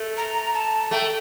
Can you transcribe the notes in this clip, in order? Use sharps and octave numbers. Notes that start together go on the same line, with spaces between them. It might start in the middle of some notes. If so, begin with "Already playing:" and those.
Already playing: A3
A#5
A5
A3 G5